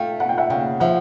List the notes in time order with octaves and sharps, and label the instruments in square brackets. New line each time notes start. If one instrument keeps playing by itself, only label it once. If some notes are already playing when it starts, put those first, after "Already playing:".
Already playing: [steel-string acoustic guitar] A3 [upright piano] F5 G5
[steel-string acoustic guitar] C#3 [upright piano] F#5
[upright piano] G5
E5 F#5
[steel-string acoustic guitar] C#3 [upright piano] F5 G5
[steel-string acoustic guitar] F3 [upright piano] E5 F#5